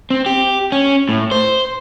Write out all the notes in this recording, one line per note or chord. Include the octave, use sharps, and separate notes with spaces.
C4
G4
C#4
A2
C5